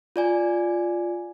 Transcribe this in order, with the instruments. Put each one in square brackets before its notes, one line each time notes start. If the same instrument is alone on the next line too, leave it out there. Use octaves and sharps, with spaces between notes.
[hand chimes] F4 D5 G#5